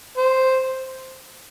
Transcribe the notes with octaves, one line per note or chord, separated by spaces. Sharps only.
C5